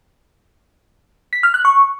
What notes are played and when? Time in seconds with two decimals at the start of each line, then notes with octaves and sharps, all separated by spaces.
1.33 B6
1.43 F6
1.54 F#6
1.65 C#6